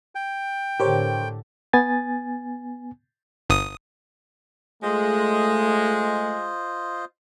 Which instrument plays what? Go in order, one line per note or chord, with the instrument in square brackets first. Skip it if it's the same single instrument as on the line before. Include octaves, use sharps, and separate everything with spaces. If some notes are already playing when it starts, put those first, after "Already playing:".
[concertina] G5
[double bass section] A2 D3 [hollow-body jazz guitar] G4 [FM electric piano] A#4 C5 C#5
[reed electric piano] B3 G#5 A6
[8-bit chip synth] G1 D#6
[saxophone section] G#3 [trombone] A3 [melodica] F4 C5 D#5